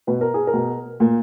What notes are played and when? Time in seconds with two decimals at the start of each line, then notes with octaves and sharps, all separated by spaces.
0.07 B2 B4
0.21 A#4
0.34 G#4
0.47 A#4
0.54 B2
1.00 A#2